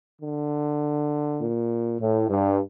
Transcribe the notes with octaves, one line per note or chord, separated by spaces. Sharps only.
D3
A#2
A2
G2